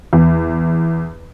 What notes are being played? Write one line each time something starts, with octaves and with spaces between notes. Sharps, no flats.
E2